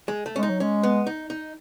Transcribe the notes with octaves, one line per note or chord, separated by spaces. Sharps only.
G#3
A3
G#3 C#4
D#4
F#3
G#3 C#4
B3
D#4
D#4